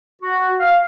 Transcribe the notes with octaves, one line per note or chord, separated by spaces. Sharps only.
F#4
F5